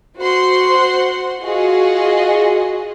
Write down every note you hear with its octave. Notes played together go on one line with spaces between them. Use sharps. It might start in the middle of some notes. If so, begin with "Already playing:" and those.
F#4 C5 F#5 C6
F4 F#4 G#4 D#5